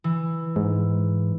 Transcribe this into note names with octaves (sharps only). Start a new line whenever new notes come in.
E3
G#2